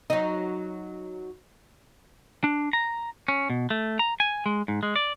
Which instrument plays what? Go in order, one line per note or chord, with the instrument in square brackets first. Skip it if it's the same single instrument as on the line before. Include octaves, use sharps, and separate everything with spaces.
[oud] F#3 D#4
[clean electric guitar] D4
A#5
C#4
B2
A3
A#5
G#5
G#3
G#2
G#3
D5